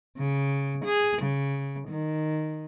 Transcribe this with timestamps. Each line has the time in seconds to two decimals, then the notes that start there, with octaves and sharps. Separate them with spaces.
0.18 C#3
0.85 G#4
1.22 C#3
1.88 D#3